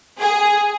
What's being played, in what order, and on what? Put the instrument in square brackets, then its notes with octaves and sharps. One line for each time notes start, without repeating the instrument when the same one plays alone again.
[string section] G#4